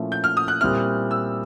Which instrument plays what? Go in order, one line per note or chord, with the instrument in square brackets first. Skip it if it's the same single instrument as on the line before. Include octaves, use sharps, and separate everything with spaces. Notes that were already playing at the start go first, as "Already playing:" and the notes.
Already playing: [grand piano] A#2 F3 A3 C#4 E4
[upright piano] G6
F6
D#6
F#6
[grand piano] A#2 G3 C4 E4 [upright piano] F6
[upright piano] E6